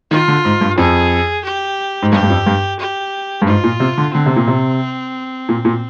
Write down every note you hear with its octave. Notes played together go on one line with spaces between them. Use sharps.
D#3 F4
D3
G#2
G2
F2 G#4
G4
G#2
G2 G4
G2
F2
G2
G4
G2
G#2 F4
A#2
C3
D3
D3 C4
C3
A#2
C3
A#2
A#2